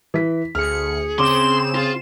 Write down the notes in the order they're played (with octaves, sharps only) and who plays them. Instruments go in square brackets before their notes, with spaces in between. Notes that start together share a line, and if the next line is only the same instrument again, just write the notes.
[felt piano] E3 B6
[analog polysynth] D2 C#7 [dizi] G#4 [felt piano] F6
[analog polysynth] C#3 C4 E7 [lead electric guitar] C6 [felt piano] D6
[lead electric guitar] F4 [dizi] G#4